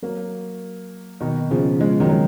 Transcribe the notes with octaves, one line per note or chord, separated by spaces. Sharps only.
F#3 A#3
B2 D#3
C#3 F3
F3 G#3
D#3 F#3
G#3